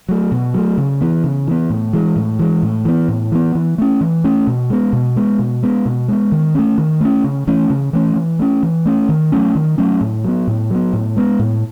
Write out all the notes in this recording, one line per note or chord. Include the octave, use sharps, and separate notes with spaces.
F#3 A3
B2
F#3 A3
C#3
E3 B3
C#3
E3 B3
A2
E3 G#3
A2
E3 G#3
A2
E3 B3
A2
E3 B3
E3
A3 C#4
E3
A3 C#4
B2
G#3 B3
B2
G#3 B3
B2
G#3 B3
B2
G#3 B3
D#3
A3 C#4
D#3
A3 C#4
C#3
E3 A3 C#4
C#3
E3 A3 C#4
E3
A3 C#4
E3
A3 C#4
D#3
F#3 A3 C#4
D#3
F#3 A3 C#4
A2
F#3 B3
A2
F#3 B3
A2
G#3 B3
A2